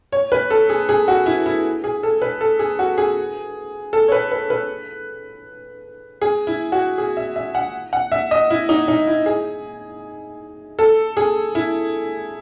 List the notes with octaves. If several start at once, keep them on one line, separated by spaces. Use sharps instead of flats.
C#5
B4
A4
G#4
G#4
F#4
E4
E4
G#4
A4
B4
A4
G#4
F#4
G#4
A4
C#5
B4
B4
B4
G#4
E4
F#4
G#4
E5
E5
F#5
F#5
E5
D#5
E4
D#4
D#4
E4
G#4
A4
G#4
E4